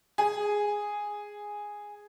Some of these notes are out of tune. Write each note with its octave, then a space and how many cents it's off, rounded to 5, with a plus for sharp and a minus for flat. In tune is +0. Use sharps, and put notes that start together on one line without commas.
G#4 -5